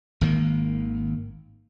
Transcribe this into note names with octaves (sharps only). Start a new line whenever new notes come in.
G#1 D#3 A#3